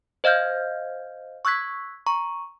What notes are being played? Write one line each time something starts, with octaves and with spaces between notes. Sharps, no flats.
C5 D#5 F5 F6 G6 G#6
C#6 E6 F#6 G#6 B6
A#5 C#6